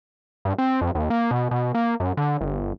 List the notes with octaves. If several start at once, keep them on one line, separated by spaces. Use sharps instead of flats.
G2
C4
F2
D#2
A#3
B2
B2
A#3
F#2
D3
G1